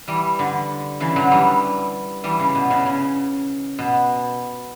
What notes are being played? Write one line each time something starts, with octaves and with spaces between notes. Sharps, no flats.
E3 G3
D3
C#3 E3
D3 F#3
E3 G3
E3 G3
C#3
B2
C#3
C#3
B2